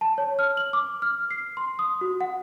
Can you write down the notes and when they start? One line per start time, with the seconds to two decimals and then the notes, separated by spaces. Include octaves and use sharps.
0.01 A5
0.18 C#5
0.39 F6
0.57 F#7
0.73 D6
1.02 F6
1.31 C7
1.57 C6
1.79 D#6
2.01 F#4
2.21 F#5